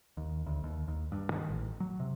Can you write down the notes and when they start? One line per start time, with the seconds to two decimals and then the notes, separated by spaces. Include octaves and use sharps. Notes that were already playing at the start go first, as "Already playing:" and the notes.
0.17 D#2
0.46 D2
0.63 D#2
0.88 D#2
1.12 G2
1.31 D#3
1.49 A1
1.80 F#3
2.00 C3